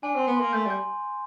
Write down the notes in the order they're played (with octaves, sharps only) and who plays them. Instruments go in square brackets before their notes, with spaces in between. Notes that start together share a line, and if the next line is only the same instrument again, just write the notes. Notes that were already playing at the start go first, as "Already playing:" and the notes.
[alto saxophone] D4 [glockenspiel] G#5
[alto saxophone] C4 [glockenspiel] C6
[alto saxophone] B3
[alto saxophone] A#3 [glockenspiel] C6
[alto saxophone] A3 [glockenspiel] G6
[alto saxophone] G3 [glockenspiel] G6